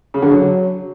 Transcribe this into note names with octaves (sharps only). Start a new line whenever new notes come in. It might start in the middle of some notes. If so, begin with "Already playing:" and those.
C#3
D3
F#3